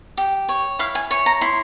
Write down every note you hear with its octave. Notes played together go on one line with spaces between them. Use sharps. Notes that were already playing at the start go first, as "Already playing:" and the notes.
G4
C#5
E4 F5
G#5
C#5 G#5
A#5
E4 C6